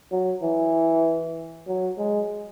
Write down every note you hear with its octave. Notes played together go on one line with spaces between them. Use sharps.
F#3
E3
F#3
G#3